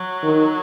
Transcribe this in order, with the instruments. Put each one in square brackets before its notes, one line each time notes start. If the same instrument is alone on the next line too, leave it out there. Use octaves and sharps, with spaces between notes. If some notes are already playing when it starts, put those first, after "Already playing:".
Already playing: [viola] F#3
[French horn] D#3